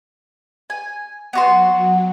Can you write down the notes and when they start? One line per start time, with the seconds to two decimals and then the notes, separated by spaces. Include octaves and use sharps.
0.70 G#5
1.33 F#3 B3 F#4 C6